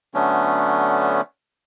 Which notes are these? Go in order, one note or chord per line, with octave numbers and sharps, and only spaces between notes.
D3 F#3 A3 B3 C#4 D4